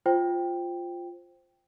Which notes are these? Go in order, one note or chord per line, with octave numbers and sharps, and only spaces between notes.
F4 C5 G5